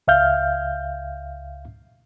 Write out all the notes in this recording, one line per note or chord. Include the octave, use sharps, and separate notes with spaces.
C#2 E5 F5 F6 G6